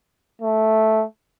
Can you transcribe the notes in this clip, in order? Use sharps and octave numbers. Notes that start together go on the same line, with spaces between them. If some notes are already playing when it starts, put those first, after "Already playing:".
A3